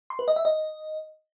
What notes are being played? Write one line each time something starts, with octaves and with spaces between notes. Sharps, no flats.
C6
B4
D#5
E5
D#5